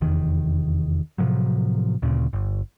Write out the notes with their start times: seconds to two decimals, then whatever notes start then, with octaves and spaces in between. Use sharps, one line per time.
0.01 F1 E2 D#3
1.18 A2 C3 F3 F#3
2.02 D2 A#2 C#3
2.33 G1